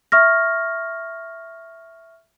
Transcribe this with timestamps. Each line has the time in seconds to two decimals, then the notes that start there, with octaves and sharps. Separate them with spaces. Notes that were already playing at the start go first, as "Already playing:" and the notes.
0.12 E5 C#6 F6 A#6